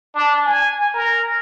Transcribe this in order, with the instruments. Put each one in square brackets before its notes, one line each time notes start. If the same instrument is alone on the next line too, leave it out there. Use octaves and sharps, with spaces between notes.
[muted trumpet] D4
G#5
A#4